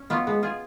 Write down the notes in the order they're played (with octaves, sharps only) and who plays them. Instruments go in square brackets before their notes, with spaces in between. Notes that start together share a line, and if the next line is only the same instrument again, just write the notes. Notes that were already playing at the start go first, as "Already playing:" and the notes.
Already playing: [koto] C#4
F#3 B3 F4
[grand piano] G#3 [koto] B3
[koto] F4 G#4